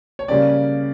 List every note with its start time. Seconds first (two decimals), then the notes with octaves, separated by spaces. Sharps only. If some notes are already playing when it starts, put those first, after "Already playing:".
0.19 C#5
0.28 C#3 G3 A#3 C#4 D5